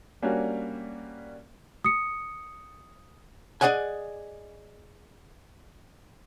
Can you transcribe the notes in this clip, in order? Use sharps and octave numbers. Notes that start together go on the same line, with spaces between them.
G3 A#3 C#4 D4 F#4
D#6 C#7
G#4 A4 D5 D#5 F#5 G#5